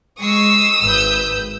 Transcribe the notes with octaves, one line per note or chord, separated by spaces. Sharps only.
G#3 C#6 D#6 E6 C7
G#1 B4 G6